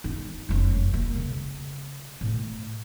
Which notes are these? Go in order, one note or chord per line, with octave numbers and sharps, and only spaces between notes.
D#4
F1 F#2
A#3
C#3
A2